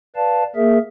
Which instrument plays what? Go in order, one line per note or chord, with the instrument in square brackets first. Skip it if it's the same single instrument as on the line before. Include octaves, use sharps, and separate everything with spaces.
[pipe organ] B4 D5 F5 A5
A#3 G#4 A#4 E5